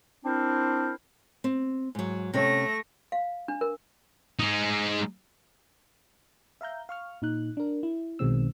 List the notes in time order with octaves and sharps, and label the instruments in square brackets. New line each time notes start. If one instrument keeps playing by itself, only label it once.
[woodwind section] C4 D4 E4 A#4 C5
[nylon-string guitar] C4
G#2 F#3
[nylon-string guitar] C3 C#4 C#5 [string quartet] A3 A#6
[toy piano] F5
D4
A#4
[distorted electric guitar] G#3 D#4
[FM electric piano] E5 F5 A#5 G6
F5 C#6 F6
A#2 D#4 F#6
D4 A#4
E4
B1 B2 D#3 G#3 C4 E6